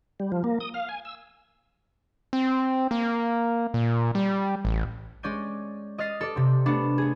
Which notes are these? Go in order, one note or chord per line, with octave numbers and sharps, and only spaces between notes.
G3
F3
A#3
D#6
F5
G#5
E6
C4
A#3
A#2
G3
A1
G#3 C#4 D5 G6 D#7
D#5 D#6 F6 A6 C7
A4 D5
C3 C4
A3 B3 D4
B3 G#4